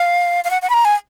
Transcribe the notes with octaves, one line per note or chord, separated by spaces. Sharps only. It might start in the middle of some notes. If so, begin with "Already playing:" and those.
Already playing: F5
F5
F#5
F#5
B5
A#5
G#5